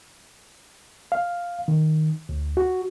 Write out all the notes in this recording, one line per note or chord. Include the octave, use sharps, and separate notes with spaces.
F5
D#3
D2
F#4